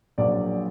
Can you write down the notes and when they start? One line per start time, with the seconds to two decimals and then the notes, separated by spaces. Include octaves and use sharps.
0.18 A#1 A#2 F#3 D5